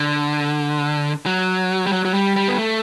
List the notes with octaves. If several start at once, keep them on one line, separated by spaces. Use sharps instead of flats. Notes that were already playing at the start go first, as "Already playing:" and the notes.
Already playing: D3
F#3
G3
F#3
F#3
G3
G3
B3
A3